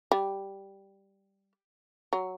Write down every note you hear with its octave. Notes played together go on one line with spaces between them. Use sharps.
G3
F#3